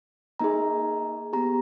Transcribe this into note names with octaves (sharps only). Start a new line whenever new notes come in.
A#3 D#4 G#4 A#5
B3 G4 A#5